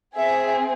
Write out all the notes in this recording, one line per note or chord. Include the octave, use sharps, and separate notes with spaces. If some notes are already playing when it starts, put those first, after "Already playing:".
C4 G#4 E5